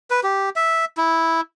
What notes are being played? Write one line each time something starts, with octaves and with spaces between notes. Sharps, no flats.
B4
G4
E5
E4